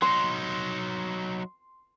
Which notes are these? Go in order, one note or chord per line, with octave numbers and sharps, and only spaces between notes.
F#3 D#4 C6